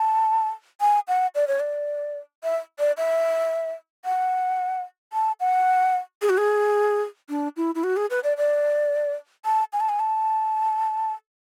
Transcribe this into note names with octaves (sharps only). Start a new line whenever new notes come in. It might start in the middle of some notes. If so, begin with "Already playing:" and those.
Already playing: A5
G#5
F#5
D5
C#5
D5
E5
D5
E5
F#5
A5
F#5
G#4
F#4
G#4
D4
E4
E4
F#4
G#4
B4
D5
D5
A5
G#5
A5
G#5
A5